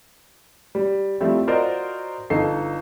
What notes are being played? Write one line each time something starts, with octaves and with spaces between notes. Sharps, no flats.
G3
F3 G3 A3 C4 E4
F4 F#4 A#4 C5 D5 D#5
G1 D#4 A4 C7